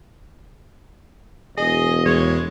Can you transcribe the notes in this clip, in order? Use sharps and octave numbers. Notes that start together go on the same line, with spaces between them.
E1 G#4 D#5
E2 G#3 C#5